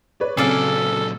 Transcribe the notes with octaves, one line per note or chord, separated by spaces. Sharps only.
B4 C#5 D5
A#2 C#3 F#3 C4 G#4 A4 D5 F5